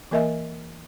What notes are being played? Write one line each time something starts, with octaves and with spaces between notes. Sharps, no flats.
E3 A#3 A#4 D#5 E5 G#5